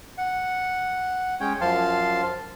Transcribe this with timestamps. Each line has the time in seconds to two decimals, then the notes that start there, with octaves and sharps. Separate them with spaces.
0.18 F#5
1.40 G#3 C#4 C#5 G5
1.61 F#2 F3 F5 A5 C6